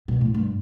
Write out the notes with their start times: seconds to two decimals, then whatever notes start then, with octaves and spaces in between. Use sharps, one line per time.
0.08 B2
0.21 A2
0.34 G2